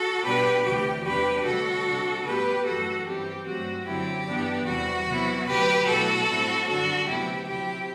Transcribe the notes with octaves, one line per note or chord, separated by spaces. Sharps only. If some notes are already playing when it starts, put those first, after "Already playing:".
Already playing: F#4 A4
B2 G3 B3 D4 G4 B4
D2 C3 E3 G4
E2 C3 G3 D4 G4 B4
D2 C3 G3 F#4 A4
C3 G3 D4
A2 G3 B3 G4 B4
F#2 E3 A3 F#4 A4
G2 E3 G3 C4 G4
G2 F#3 A3 C4 F#4
F#2 D3 F#3 C4 E4 G4
G2 E3 B3 D4
E2 C3 E3 G3 F#4
C3 F#3 B3 E4
D2 C3 F#3 G4 B4
B2 F#3 A3 E4 F#4 A4
A2 G3 C4 E4
F#2 D3 G3 D4 F#4 A4
D2 C3 F#3 B3 E4 G4
C3 F#3 C4 E4 G4